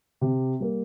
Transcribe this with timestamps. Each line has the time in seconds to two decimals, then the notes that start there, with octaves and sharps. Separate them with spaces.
0.21 C3
0.60 G3 A#3